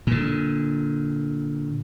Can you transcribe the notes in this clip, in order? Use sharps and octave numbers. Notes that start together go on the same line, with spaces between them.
A#2 D3